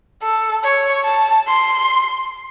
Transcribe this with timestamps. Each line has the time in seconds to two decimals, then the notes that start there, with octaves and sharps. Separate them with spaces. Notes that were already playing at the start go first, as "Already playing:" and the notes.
0.22 A4
0.63 C#5
1.05 A5
1.47 C6